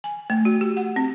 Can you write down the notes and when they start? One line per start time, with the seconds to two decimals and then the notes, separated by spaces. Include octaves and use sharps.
0.04 G#5
0.30 A3
0.45 F#4
0.61 G4
0.77 F#5
0.96 C4